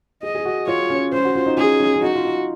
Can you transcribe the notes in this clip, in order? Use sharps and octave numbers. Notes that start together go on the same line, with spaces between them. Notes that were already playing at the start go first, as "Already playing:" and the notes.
G#4 D#5
G#4
F#4
F4 C#5
C#4
C#4 C5
F#4
F4
D#4
C#4 G#4
C#4
C#4
D#4 F#4
F4
D#4